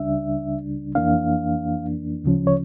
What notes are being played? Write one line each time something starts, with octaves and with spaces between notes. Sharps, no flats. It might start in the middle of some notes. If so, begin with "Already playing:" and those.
Already playing: C#2 C#3 G3 D4 E5
F2 E3 A#3 D4 F5
D2 C#3 F3 C#4
C#5